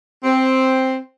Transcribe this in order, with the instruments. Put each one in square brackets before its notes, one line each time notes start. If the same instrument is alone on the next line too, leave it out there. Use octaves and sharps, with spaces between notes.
[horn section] C4